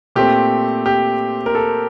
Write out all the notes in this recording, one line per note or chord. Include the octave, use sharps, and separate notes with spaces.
A#2 A3 C4 G4
G4
A#4
A4